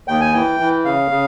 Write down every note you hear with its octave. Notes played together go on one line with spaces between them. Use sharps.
D#2 G5
G#5
E3 G5
E3
C#3 F5
C#3